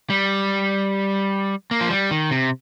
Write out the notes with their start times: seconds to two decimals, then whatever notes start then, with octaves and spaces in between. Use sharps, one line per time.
0.10 G3
1.71 A#3
1.81 F3
1.91 G3
2.11 D#3
2.31 C3